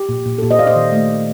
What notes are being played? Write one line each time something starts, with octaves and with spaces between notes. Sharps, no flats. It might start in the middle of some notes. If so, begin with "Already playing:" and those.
Already playing: G4
A#2
A#2
A4
A#2 G4
C5 D#5
A#2 D5 F5
C5 D#5
D#3
A3
A3